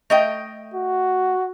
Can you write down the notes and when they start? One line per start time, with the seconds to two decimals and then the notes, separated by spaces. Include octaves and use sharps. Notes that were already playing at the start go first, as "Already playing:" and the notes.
0.10 A3 D#5 G5
0.74 F#4